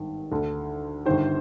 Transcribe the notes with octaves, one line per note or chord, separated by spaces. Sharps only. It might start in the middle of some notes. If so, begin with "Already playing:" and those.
Already playing: G#1 G2 D#3
D2 D3
G1 G2 D#3 C5